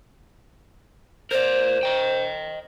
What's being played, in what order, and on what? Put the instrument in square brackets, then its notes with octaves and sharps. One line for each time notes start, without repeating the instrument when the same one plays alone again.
[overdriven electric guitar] A#4 D5 [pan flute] C5
[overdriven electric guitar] D#5 G5